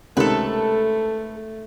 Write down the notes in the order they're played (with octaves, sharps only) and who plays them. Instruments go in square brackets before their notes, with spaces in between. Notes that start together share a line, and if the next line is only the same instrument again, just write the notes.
[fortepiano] C#2 C3 D#3 [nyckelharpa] A3 [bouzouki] A4 B4